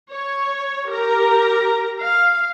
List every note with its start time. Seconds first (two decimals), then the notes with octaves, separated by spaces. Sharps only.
0.10 C#5
0.87 G4 A#4 A#5
2.00 F5